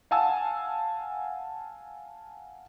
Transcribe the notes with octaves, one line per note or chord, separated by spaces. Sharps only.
F5 F#5 G#5 A5 E6